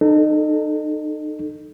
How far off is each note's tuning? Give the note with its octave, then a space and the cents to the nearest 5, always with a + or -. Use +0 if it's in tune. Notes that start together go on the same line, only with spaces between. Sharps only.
D#4 -30 A4 +0